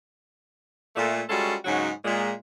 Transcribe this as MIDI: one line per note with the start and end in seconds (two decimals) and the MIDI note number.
0.96 1.21 46
0.96 1.21 57
1.29 1.54 55
1.29 1.54 56
1.29 1.54 61
1.29 1.54 65
1.29 1.54 66
1.29 1.54 69
1.65 1.89 44
1.65 1.89 49
1.65 1.89 54
1.65 1.89 56
1.65 1.89 63
1.65 1.89 66
2.05 2.31 46
2.05 2.31 56